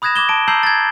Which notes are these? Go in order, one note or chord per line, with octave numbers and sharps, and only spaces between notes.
B5 D#6 F#6 G#6 A#6 E7
D6 G#6 E7 G7
A5 D7
A5 A#5 E6 G6 C7 F#7
G#6 A6